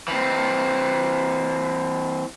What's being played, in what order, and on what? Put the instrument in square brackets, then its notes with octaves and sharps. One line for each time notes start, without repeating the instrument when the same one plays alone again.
[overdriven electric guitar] E3 C4